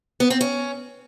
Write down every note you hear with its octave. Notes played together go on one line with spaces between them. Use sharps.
B3
C4
C#4